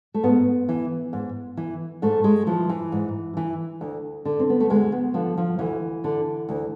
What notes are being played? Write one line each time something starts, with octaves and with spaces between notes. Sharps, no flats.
A3
G#2 B3
E3
G#2
E3
G#2 A3
G#3
E3 F3
E3
G#2
E3
D2
D3
C4
B3
A3
D2 G#3
B3
D3 F3
F3
D2 E3
D3
D2